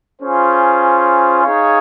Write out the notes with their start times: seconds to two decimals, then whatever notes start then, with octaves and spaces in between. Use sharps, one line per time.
0.21 C#4 F4 G#4 C5
1.43 D#4 G#4 C#5 F5